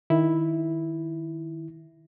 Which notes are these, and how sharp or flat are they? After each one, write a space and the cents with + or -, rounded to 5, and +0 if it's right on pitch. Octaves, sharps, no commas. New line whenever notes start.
D#3 +0 E4 -5